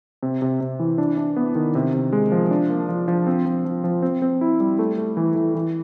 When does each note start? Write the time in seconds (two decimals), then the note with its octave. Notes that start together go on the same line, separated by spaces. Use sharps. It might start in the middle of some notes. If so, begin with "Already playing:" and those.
0.23 C3
0.42 C3
0.61 C3
0.79 E3
0.98 D4
1.17 D4
1.36 B3
1.55 D#3
1.75 C3
1.93 C3
2.13 G#3
2.32 F3
2.51 D4
2.69 A#3
2.89 F3
3.08 F3
3.27 C4
3.46 F3
3.65 F3
3.84 F3
4.02 C4
4.22 C4
4.41 E4
4.60 G3
4.79 A3
4.98 A3
5.17 E3
5.36 E3
5.55 E3